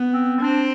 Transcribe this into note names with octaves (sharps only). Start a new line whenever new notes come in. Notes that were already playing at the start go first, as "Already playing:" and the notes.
Already playing: B3
C4
C4 D4